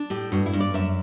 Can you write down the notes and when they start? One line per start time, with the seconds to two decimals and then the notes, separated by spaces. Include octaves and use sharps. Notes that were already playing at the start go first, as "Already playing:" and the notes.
Already playing: D4
0.10 A2 G4
0.32 G2 F#4
0.46 E4
0.53 G2
0.60 D5
0.74 F#2 E5